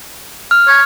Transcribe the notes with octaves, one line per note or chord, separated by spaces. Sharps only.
F6
C#5